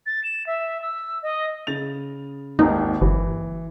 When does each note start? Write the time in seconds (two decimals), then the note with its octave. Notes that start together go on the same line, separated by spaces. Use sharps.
0.06 A6
0.24 E7
0.47 E5
0.82 E6
1.23 D#5
1.67 C#3 A6 F7
2.59 G#1 D#2 D#4
3.01 G1 E3